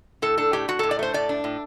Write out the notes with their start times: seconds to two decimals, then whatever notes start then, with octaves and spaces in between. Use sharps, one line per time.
0.22 A2 A4
0.38 D4 A4
0.53 A2 G4
0.68 A2 F#4
0.79 A2 A4
0.91 D5
0.99 A3 C5
1.14 A2 D5
1.29 D4
1.44 A2